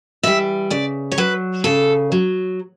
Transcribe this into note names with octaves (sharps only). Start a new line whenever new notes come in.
E3 G3 E5
C#3 D5
C#5
F#3 B4
C#3 A4
F#3